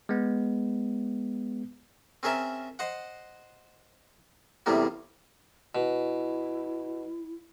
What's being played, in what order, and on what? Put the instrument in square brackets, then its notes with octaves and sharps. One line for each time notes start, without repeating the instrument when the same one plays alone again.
[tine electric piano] G#3 B3
[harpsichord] C4 C#4 G#4 A#4 E5 A5
C5 D#5 F#5
E2 A2 C3 G3 A#3 B3
[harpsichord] B2 [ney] E4